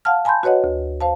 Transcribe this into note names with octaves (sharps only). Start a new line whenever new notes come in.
F5 F#5 A5 F6
G#5 A5 B5 C6 G6
F#4 B4 C#5 D#5 F#5
D2
C5 F5 A5